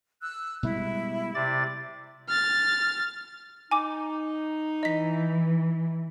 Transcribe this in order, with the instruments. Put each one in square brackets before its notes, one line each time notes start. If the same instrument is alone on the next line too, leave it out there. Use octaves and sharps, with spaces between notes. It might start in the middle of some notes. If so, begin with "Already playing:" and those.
[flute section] E6 F#6
[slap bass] B2 G3 G#3 [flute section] E4
[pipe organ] C3 D5 A6
[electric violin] F6 A6
[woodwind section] D#4 [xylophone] G#5 D6
[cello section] E3 [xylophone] D#5 B6